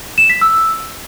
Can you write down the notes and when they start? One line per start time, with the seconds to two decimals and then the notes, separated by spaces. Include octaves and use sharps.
0.18 E7
0.30 B6
0.41 E6